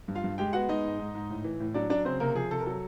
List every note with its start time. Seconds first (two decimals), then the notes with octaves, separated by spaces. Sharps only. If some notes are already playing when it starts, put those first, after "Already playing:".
0.08 G2
0.15 F4 F5
0.24 G2
0.38 G#3 G4 G5
0.53 B3 F#4 F#5
0.69 G#3 D#4 D#5
0.85 G#2
0.99 G#2
1.15 G#2
1.30 A2
1.44 E3
1.60 A2
1.74 F#3 D4 D5
1.90 F#3 D4 D5
2.05 C#3 C4 C5
2.20 C3 A#3 A#4
2.35 F3 G#4
2.51 C3 A4
2.59 A#4
2.66 F#3 A4